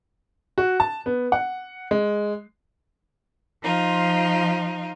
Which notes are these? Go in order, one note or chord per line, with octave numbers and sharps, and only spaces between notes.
F#4
A5
B3
F#5
G#3
F3 D#4 F4